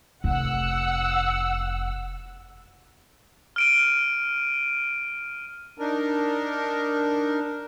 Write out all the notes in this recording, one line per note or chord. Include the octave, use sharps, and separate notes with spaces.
F1 F#5 E6
F6 D7 D#7
D4 D#4 A#4